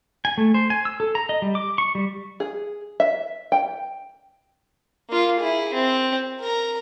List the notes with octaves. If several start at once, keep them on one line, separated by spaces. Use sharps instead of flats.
G#5
A3
C5
G#5
E6
A4
A#5
D#5
G3
D6
C#6
G3
G#4
E5
G5
A#3 F4
E4 G#4
C4
A#4 A#5